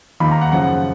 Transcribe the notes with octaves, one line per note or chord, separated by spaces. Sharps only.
D#2 D#3 A#3 F4 B5
A#5
F#5
F#2 C#3 F3 F#5
F#5